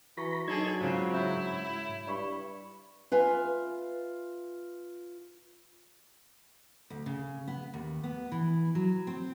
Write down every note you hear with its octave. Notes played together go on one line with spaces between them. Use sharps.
E3 F#4 B4 A#5 B5 C#6 A#6
F#3 D4 D#4 G#4 A4 G#6
G#2 C#3 C4 F4 C5 F5
E4 C#5 E5 G6
G2 D5 B5 C#6
F4 B4 E5 G#5
D2
C#3
B3
D#2
B3
E3
F#3
C4